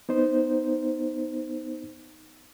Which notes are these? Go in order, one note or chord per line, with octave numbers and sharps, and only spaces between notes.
B3 D#4 C5